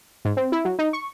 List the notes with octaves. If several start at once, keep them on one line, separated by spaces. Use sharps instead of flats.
G#2
C4
E4
F#3
D#4
C#6